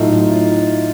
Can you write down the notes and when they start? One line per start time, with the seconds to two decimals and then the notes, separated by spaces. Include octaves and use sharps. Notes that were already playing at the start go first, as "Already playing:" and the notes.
Already playing: A2 F#3 A3 D#4 F4